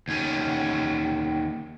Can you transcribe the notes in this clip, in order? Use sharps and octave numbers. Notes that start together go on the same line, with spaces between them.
D#2 C#4